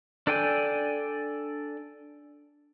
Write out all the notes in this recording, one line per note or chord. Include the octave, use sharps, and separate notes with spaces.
D4 A4 D5 G5 G#5